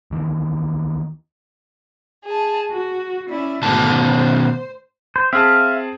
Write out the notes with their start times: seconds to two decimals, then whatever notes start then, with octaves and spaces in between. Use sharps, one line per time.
0.11 D2 D#3 E3
2.25 G#4 A5
2.70 F#4
3.29 C#4 E4 D5
3.63 D2 G#2 B2 D#3 A5 D6
3.96 C5
5.16 C5
5.33 C4 G#4 E5 F5 A5